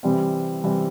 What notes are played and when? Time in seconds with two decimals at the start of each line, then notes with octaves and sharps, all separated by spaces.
0.03 C3 E3 G3 C4
0.64 C3 E3 G3 C4